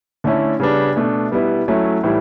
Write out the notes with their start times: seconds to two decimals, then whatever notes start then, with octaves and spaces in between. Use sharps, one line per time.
0.24 D3 A3 C#4 E4
0.60 C#3 G3 B3 D4
0.96 B2 A3 D4
1.31 B2 G3 B3 E4
1.68 F#3 A3 C#4 E4
2.04 A2 E3 G3